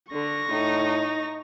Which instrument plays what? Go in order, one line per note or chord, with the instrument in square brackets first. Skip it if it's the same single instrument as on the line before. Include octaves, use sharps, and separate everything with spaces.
[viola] D3 [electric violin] C#6 A#6
[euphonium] A2 [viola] D#4